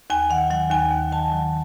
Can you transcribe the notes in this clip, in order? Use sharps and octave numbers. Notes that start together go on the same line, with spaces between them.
D#2 G#5
D#3 F#5
F#3 F#5
D#2 G#5
D#2
D#3 A5
F#3